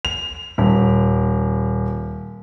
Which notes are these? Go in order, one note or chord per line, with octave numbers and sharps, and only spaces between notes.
F7
D#1